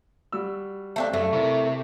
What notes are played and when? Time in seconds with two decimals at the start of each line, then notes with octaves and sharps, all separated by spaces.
0.32 G3 F#4 E6
0.96 A3 C4 D4
1.13 F#2 A3
1.33 C3 E4 A#4 C#6